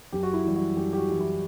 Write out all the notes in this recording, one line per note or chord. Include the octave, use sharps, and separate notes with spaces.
F#2 G4
F#4
E4
E3 G3
F#4
F#2 G4
G4
F#4
E3 G3
E4